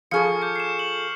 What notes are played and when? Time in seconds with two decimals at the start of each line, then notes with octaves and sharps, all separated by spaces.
0.11 F3 G#4 A4 C#6 F6 C#7
0.42 D6 G6 C#7
0.56 C7 E7
0.79 F#7